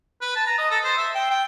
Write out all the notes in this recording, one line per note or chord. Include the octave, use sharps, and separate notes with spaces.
B4
A5
A#5
D#5
A4
C5
E5
G5
G5